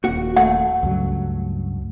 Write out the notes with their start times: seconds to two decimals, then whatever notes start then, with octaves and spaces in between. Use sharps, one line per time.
0.04 D#1 A#3 F#4 F#5
0.36 A3 F#5
0.83 C#2 G2 F#3